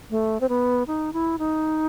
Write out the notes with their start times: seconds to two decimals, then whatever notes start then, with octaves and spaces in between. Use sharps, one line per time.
0.10 A3
0.41 C4
0.49 B3
0.87 D#4
1.13 E4
1.39 D#4